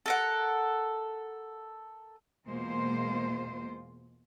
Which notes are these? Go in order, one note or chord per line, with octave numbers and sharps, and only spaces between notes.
A4 A#4 F#5
E2 B2 G#3 A#3 F4 C5